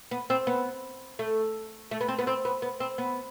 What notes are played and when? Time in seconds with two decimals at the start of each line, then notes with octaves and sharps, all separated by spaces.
0.11 B3
0.30 C4
0.47 B3
1.19 A3
1.91 A3
2.01 B3
2.08 C4
2.19 B3
2.27 C4
2.45 B3
2.62 B3
2.80 C4
2.98 B3